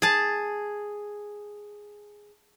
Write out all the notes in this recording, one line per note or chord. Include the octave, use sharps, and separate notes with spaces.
G#4 A5